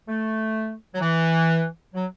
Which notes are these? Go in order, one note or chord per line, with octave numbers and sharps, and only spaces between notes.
A3
F#3
E3
F#3